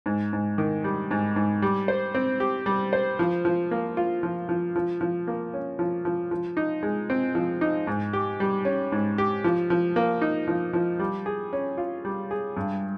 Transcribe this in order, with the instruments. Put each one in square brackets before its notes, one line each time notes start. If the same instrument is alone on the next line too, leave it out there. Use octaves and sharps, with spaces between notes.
[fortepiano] G#2
G#2
D#3
G3
G#2
G#2
G3
C5
C4
G4
G3
C5
F3
F3
A#3
F4
F3
F3
F3
F3
A#3
C#4
F3
F3
F3
D#4
G#3
C4
F3
D#4
G#2
G4
G3
C#4
G#2
G4
F3
F3
A#3
D#4
F3
F3
G3
G#4
C#4
F4
G3
G#4
G2